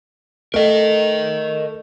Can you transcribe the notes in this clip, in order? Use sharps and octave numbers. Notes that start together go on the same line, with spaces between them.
A3 A#4 D#5